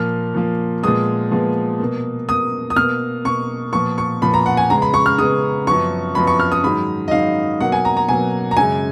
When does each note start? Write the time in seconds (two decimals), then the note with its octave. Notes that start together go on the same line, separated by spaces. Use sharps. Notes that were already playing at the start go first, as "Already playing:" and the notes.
Already playing: A#2 F3 A#3 F6
0.34 A#2 F3 A#3
0.83 A#2 F3 G#3 B3 D#6
1.31 A#2 F3 G#3 B3
1.80 B2 A#3
2.29 B2 A#3 D#6
2.70 D#6
2.76 B2 A#3 F6
3.25 B2 A#3 C#6
3.73 A#2 F3 B3 C#6
3.98 C#6
4.22 A#2 F3 B3 B5
4.34 A#5
4.46 F#5
4.57 G#5
4.70 C#3 G#3 B3 A#5
4.82 B5
4.94 C#6
5.06 F6
5.18 C#3 G#3 B3 D#6
5.67 F#2 F3 B3 C#6
6.15 F#2 F3 B3 B5
6.27 C#6
6.40 F6
6.52 D#6
6.63 G#2 D#3 F#3 B5
7.08 D#5
7.11 G#2 D#3 F#3 F5
7.60 B2 F#3 A#3 F#5
7.72 G#5
7.85 A#5
7.97 A#5
8.09 B2 F#3 A#3 G#5
8.51 A#5
8.57 F#2 C#3 G#3 G#5